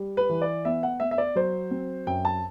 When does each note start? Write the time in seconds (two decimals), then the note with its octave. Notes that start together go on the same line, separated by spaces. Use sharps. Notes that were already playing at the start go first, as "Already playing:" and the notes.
Already playing: G3
0.17 B4
0.29 E3
0.42 D5
0.65 B3 E5
0.83 F#5
1.00 B3 E5
1.11 E5
1.18 D5
1.36 F#3 C5
1.71 C4
2.07 F#2 G5
2.25 A5